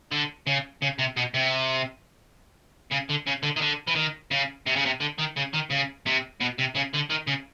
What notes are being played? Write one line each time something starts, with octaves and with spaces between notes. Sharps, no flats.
D3
C#3
C#3
C3
B2
C3
C#3
D3
C#3
D3
D#3
D3
E3
D#3
C#3
C3
C#3
C3
D3
D#3
C#3
D#3
C#3
C3
B2
C3
C#3
D3
D#3
C#3